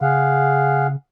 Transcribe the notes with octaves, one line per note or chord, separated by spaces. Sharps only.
C#3 G#4 F5 F#5